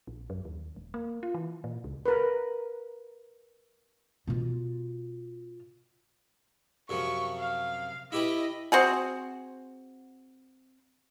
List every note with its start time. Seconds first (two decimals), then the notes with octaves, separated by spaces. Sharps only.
0.07 A#1
0.30 F#2
0.45 D#2
0.76 D#1
0.94 A#3
1.23 F4
1.34 E3
1.64 A#2
1.84 C#2
2.06 A#4 B4
4.27 B2 F4
6.89 F#2 C3 F3 C#6
7.39 F5
8.12 E4 G4 B4 D#5
8.72 C4 F#4 G#4